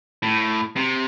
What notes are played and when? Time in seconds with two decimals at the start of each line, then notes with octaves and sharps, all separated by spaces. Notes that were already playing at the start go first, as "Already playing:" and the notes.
0.23 A2
0.76 C3